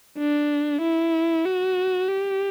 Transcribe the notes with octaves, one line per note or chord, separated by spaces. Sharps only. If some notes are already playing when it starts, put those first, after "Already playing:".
D4
E4
F#4
G4